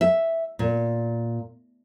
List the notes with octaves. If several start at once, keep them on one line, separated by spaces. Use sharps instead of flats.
E5
A#2